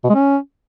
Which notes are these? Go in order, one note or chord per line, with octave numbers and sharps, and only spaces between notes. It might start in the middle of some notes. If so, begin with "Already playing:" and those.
B2
G#3
C#4